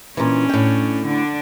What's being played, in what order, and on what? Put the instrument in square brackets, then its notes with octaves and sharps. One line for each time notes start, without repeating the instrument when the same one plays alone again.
[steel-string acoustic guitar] A#2 E3 [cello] C#4 D4
[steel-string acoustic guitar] A2 G5
[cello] D3 D4